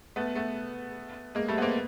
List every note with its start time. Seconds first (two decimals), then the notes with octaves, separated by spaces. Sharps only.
0.16 A3 B3
0.35 A3 B3
1.35 G#3 A#3
1.48 G3 A3
1.58 B3
1.61 A#3 C4